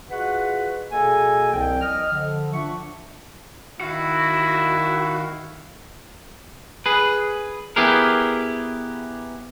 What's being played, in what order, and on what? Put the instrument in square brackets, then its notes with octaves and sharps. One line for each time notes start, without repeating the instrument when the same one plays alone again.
[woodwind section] F4 F#4 G#4 B4 D#5 F#5
B2 A#3 G#4 A4 D#5 G#5
C2 F3 C4 G5
D#5 F6
D3 F3
D4 F4 E5 F#5 C#6
[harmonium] D#3 F5 [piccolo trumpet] E4 [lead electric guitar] F#4
[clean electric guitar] G#4 B4
B3 E4 G4 G#4 A#4